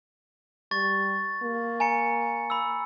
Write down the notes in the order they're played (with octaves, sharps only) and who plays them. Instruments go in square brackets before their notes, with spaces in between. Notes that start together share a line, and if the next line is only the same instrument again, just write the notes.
[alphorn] G3 [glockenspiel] C#6 A6
[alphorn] A#3
[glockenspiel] G#5 A#5 C#7
B5 E6